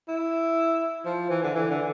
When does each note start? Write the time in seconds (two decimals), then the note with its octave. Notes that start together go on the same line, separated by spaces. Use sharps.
0.08 E4
1.05 F3
1.29 E3
1.43 D3
1.54 E3
1.70 D3